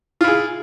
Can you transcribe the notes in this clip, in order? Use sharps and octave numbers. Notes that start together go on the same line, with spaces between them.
E4 F4 G#4